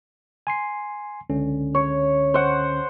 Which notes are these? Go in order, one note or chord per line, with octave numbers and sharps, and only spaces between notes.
G#5 C6 C7
C#2 D3 C#4
C#5
C5 F#5